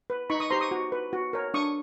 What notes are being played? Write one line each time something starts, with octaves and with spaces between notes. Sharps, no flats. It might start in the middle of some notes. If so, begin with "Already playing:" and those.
B4
D#4 B5 C#6
C#6 D#6
G4 C5 A#5 C6
C#6 D#6
F#4
B4
F#4
A#4 C#5
D4 C#6 D#6